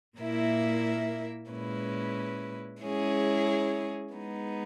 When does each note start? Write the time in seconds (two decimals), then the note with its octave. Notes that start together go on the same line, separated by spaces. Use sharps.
0.18 A#2 A#3 E4 A#4 E5
1.50 A#2 G#3 C#4 E4 B4
2.82 G#3 C#4 E4 G#4 C#5
4.13 G#3 B3 D#4